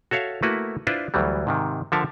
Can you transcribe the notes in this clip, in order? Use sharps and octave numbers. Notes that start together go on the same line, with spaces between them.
F#4 A4 C#5 E5 F5
A3 A#3 E4 F#4 B4
D4 E4 F4 B4 C5
D2 E3 F#3 G3
G#2 C3 D#3
D3 F3 A4 A#4 E5 A5